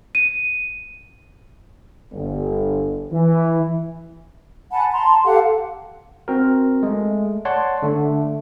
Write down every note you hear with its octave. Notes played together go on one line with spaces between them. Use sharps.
D#7
G1
E3
F#5 G#5 A5 B5
A5 A#5 C6
G4 A4 F5 F#5
C4 F#4 A#4
G#3 A3
C#5 D5 F#5 A5 C6
D3 A3 D4